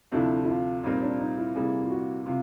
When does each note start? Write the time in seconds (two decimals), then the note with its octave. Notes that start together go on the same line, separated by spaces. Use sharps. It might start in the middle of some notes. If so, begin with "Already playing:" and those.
0.12 D2 C3 F3 A3 D4 E4
0.43 E4
0.48 F4
0.83 A#2 G3 C4 D#4 F4 A#4
1.01 D4
1.18 D#4
1.37 E4
1.54 C3 E3 G3 A#3 G#4
1.81 F4
1.90 F#4
2.26 C3 F4